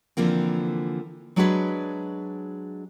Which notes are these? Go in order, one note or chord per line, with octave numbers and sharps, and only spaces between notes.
D3 E3 F3 A#3 C4
F#3 G#3 D4 F#4 G#4 B4